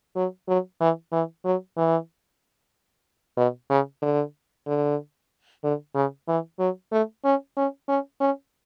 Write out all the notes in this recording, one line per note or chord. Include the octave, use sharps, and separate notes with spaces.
F#3
F#3
E3
E3
F#3
E3
B2
C#3
D3
D3
D3
C#3
E3
F#3
A3
C#4
C#4
C#4
C#4